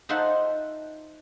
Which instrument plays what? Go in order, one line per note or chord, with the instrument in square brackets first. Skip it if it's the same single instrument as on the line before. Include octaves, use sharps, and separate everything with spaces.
[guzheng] D#4 F4 A4 C5 E5 F#5